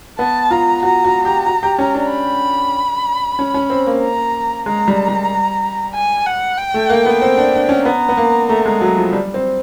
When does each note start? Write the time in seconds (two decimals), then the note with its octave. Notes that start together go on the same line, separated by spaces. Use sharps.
0.19 B3 A5
0.51 F4 A#5
0.83 F#4 A#5
1.04 F#4
1.25 G4
1.46 F#4
1.63 G4
1.79 C#4
1.94 D4
2.11 B5
3.39 C#4
3.54 C#4
3.70 C4
3.86 A#3
4.03 A#5
4.66 G#3 A#5
4.88 G3
5.08 G3
5.94 G#5
6.26 F#5
6.58 G5
6.74 A3
6.90 A#3
7.06 B3
7.22 C4
7.37 D4
7.53 D4
7.69 C#4
7.85 B3 A#5
8.09 B3
8.17 A#3
8.49 A3
8.66 G#3
8.81 F#3
8.97 F3
9.13 G3
9.34 C4